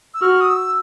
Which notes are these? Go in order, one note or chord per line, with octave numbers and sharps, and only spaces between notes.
E6
F#4 F6
D#6
E6